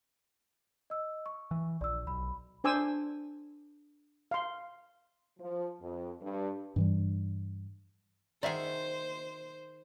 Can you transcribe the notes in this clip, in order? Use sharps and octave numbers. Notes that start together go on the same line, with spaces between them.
D#5 E6
C#6
E3
A#1 D5 E6
B1 B5
D4 C5 G#5 D6 E6
F5 C6
F3
F2
G2
G2 E3 G3
D#3 G#4 C5 D5 E5 F#5